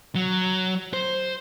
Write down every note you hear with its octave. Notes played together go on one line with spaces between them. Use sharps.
F#3
C5